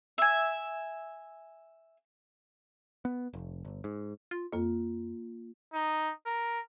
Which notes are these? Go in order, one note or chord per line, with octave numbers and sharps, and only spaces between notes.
E5 G#5
B3
F1
G1
G#2
F4
F2 A#3 F4
D#4
A#4